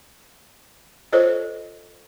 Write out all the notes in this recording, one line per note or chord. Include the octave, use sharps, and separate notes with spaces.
F4 A4 C5 C#5 D#5